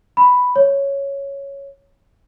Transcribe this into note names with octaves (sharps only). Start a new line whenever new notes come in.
B5
C#5